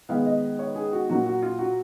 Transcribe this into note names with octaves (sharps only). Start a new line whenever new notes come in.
D#3 G#3 B3 F5
D#5
C#5
G#4
F#4
A#2 F#3 A#3 F#4
F#4
F4
F#4